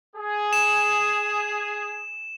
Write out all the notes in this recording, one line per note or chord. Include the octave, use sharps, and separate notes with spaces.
G#4
E7